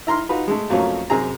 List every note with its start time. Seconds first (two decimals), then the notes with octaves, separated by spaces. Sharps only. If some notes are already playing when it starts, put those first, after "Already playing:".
0.07 E4 A#5 C6 F6
0.29 D#4 F4 F#4 B4
0.48 G#3 A3
0.70 F2 F#3 A3 A#3 C#4
1.10 F#2 C3 G#4 A#5